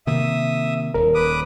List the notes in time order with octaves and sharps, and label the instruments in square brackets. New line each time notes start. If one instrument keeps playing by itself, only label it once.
[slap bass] C3 D#3 A#3 [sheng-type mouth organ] E5 D#6
[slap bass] D#1 [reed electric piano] A#4
[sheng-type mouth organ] B4 D6 D#6